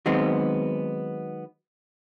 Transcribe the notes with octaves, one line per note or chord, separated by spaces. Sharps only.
D#3 F#3 G#3 B3 C4